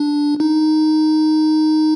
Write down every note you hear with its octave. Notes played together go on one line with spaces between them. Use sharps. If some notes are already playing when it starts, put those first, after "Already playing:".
Already playing: D4
D#4